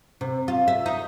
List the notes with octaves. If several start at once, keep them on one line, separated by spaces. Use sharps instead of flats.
C3
F4
E5
D#4